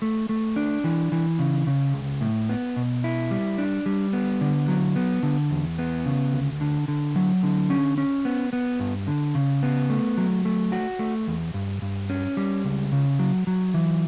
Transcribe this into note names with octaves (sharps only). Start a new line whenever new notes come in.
A3
A3
D4
E3
E3
C#3
C#3
C#2
A2
B3
B2
E4
G3
D4
G3
B3
D3
F#3
B3
D3
E2
B3
C#3
D2
D3
D3
F#3
D3
C#4
C#4
B3
B3
G2
D3
C#3
B3
A3
F#3
A3
F#4
A3
E2
G2
G2
C#4
G3
C#2
C#3
F#3
F#3
E3